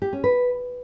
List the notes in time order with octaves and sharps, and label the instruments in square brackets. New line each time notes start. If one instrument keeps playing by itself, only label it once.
[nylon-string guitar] G4
C#4
B4